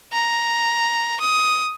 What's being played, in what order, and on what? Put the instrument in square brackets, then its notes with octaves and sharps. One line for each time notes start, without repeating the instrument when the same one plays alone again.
[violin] A#5
D#6